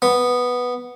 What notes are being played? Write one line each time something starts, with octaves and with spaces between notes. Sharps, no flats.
B3